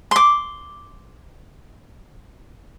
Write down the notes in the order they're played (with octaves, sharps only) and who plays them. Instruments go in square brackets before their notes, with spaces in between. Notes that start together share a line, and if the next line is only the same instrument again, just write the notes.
[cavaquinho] C6 D6